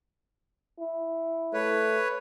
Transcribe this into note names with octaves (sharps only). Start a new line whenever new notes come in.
E4
A3 B4 C#5